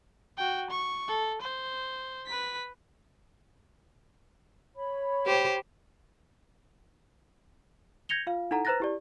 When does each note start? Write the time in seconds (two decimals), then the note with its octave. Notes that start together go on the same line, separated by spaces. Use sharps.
0.37 F#4 G5
0.71 C#6
1.08 A4
1.42 C5
2.27 B4 B6
4.76 C#5 B5
5.26 G4 C5
8.09 G6 G#6 A#6 C#7 F7 G7
8.27 F4 F5
8.51 D#4 E4 A4 F#5 A#5
8.65 B4 C5 A#5 F#6 A6 A#6
8.80 E4 G4 D5